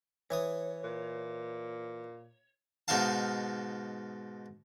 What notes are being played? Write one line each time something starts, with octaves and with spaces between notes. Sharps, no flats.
E3 C#5 C#6 D#6
A#2
G#2 B2 D#4 A#4 F5 A5